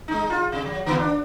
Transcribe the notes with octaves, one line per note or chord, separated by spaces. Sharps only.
G#3 D#4
F4
C3
F#3
D3 B3 F4
D4